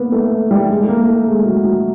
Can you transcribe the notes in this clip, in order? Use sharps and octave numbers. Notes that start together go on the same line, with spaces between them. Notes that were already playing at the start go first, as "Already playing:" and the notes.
Already playing: A#3 B3
A3
G3
G#3
A3
A#3
A3
G#3
F#3
F#3